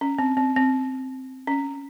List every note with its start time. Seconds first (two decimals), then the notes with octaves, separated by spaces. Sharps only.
0.01 C#4
0.19 C4
0.37 C4
0.56 C4
1.47 C#4